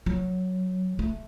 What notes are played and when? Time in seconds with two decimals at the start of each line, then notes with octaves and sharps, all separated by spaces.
0.06 F#3
0.99 A3